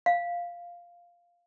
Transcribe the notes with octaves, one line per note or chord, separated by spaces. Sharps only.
F5